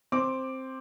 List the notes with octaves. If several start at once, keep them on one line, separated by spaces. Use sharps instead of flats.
C4 D6